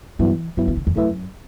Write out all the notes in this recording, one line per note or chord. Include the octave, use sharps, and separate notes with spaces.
G2 E3 F#3 B3 E4
G2 F#3 G3 B3 E4
E3
D3
E2
F#2 A3 E4 B4 E5